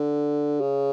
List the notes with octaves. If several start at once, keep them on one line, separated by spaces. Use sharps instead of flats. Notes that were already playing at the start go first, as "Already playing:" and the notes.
Already playing: D3
C#3